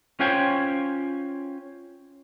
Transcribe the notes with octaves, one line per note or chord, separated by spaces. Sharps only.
C#4 F4 C5 G5 G#5